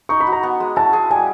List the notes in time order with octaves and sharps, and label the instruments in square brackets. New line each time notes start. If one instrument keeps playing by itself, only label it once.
[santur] D#4 [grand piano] C#6
[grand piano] B5
[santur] F#4
[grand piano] A#5
[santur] B3
G#3
[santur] E4 [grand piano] A5
[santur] G#4
[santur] G3 [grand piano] G#5